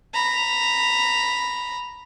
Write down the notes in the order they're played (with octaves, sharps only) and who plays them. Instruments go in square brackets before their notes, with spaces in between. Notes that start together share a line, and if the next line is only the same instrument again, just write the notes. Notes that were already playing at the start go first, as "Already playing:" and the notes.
[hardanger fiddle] A#5 B5